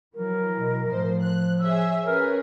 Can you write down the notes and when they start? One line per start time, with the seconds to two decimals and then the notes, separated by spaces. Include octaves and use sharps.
0.15 E3 F#3 A#4
0.56 B2
0.87 A2 F3 C5
1.21 F#6
1.60 G#4 C#5 E5 E6
2.06 C#4 G#4 A#4 B4